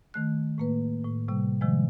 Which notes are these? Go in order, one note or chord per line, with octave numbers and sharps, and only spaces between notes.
D#3 A3 F#6
A2 A#3 B4
A2
A2 C3 G3
C3 D#3 F3 G#3